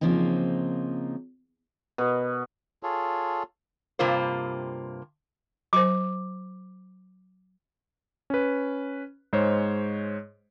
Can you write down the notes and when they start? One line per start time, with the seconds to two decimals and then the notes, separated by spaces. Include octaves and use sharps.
0.01 C#3 F3 A#3 C4 D#4
1.98 B2
2.83 F4 G#4 A4 C#5
3.99 G2 C3 A#3 F4 C5
5.73 F#3 C5 D6
8.30 C#4 B4
9.33 G#2 G#3 C5 C#5